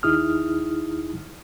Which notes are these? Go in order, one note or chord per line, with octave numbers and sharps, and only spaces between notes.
D#2 D#4 E4 G#4 D#6 F6